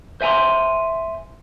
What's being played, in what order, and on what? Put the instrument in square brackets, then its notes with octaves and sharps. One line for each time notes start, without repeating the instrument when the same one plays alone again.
[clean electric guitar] C5 E5 G#5 A#5 C6